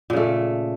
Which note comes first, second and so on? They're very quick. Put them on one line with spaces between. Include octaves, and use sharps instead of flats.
A#2 C#3 A3